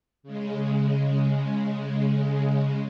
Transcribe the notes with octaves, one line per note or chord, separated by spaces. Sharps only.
C#3 G#3